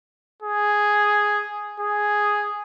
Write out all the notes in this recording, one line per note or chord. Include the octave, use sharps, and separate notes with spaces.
G#4
G#4